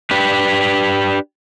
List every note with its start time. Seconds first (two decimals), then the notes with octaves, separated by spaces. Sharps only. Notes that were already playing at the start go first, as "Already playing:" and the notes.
0.11 D4 G4 B4